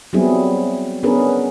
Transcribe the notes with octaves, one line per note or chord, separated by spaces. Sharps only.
F#3 G3 B3 C4 E4 G#4
B3 C#4 D4 G#4 A#4 B4